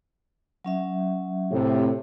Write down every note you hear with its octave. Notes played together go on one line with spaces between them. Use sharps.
F#3 C#4 E5
A2 C3